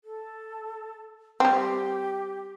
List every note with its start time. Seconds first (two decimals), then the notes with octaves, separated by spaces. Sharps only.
0.04 A4
1.40 G3 C4 G4